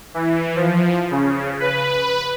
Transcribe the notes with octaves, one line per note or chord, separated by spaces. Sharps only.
E3
F3
C#3
B4